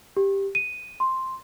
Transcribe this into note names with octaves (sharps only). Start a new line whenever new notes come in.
G4
D#7
C6